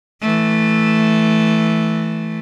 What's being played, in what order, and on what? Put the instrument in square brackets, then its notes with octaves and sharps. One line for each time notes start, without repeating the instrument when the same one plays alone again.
[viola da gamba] E3 A3